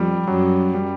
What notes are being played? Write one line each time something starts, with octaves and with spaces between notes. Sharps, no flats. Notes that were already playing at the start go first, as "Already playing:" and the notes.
Already playing: F2 G3
F#2 F#3
G3